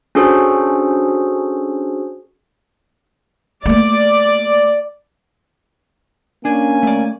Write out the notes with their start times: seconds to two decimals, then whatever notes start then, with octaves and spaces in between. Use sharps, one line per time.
0.15 C#4 D4 F#4 G#4 A4 C5
3.66 A3 A#3 D5
6.45 A#3 C#4 D4 G#5
6.83 A3 D5